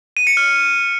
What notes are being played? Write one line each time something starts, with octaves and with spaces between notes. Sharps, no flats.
D#7
C#7
F6